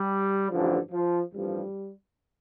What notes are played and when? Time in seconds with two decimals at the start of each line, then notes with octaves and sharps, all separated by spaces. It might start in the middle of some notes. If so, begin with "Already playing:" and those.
Already playing: G3
0.49 A1 G2 D3 F3
0.92 F3
1.33 A1 G2 F3 G3